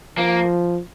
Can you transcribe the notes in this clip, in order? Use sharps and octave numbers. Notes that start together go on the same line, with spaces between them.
F3 A#3